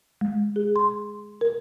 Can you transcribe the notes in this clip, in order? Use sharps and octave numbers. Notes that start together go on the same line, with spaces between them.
G#3
G#4
C6
A#4